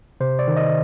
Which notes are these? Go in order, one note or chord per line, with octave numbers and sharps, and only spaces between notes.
C3 C5
D5
D#3
D#5